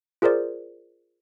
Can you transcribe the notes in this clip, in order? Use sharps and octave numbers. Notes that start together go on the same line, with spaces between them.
F4 G#4 A#4 C5 D5